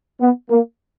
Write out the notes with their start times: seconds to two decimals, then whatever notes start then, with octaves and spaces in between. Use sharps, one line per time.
0.21 B3
0.50 A#3